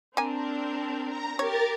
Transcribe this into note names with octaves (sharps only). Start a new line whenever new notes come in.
A#3 C4 D4 A#4 G#5
A#5
G4 A#4 C#5 A6